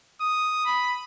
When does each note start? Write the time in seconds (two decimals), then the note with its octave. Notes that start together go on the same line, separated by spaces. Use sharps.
0.21 D#6
0.66 B5